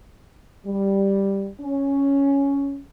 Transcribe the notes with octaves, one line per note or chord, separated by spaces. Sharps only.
G3
C#4